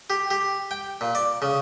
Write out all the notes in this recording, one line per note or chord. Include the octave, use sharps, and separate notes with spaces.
G4
G4
G5
A#2
D5
C#3